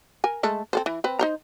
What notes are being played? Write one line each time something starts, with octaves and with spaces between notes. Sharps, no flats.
A#4 G#5
G#3 A3 A4
C4 A4 C5
E3
C4 B4
D#4 C5 A#5